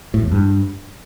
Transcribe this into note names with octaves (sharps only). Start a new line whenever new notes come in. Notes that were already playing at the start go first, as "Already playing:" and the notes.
A2
E2
G2